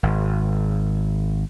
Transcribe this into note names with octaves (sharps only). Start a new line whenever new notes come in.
G#1